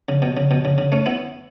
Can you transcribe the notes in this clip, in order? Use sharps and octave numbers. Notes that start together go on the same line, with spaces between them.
C#3
B2
C#3
B2
C#3
C#3
A3 C#4
B3 E4